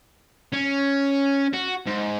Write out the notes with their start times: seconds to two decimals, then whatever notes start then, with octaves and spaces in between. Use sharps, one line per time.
0.53 C#4
1.53 F#4
1.86 G#2